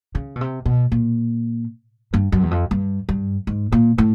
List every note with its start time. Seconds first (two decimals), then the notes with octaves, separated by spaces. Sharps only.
0.15 C#3
0.36 B2
0.41 C3
0.66 B2
0.92 A#2
2.14 G2
2.32 F#2
2.43 E2
2.51 F2
2.71 G2
3.09 G2
3.47 G#2
3.72 A#2
3.98 A2